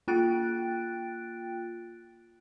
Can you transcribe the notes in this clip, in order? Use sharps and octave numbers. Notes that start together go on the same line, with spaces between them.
A#3 F4 G5 F#6 A6 D7